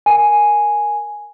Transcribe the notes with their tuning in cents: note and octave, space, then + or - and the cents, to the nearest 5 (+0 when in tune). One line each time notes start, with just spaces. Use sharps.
A#4 +0 G#5 +0